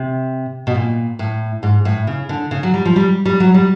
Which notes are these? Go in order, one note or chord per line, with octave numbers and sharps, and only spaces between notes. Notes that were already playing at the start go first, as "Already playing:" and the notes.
Already playing: C3
B2
A#2
A2
G#2
A2
C#3
D3
C#3
F#3
G3
F3
G3
G3
F#3
G3